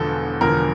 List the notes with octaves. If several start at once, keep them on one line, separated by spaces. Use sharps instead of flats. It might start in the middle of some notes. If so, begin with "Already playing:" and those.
Already playing: E1 E2 D3 F3 A4
E1 E2 D3 F3 A#4